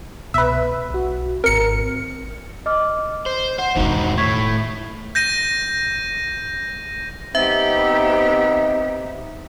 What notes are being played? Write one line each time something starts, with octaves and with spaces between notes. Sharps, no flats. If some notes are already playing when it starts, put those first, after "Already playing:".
C2 B2 B4 E5
B1 F#4
G#1 C4 A#4 C#7
D#5 D6 F6
C5
C5 F#5
E1 G#2 D#3 D#4 F#4
A2 C#6 G#6 B6
G6 A#6 D#7
B3 C4 D#4 G4 E5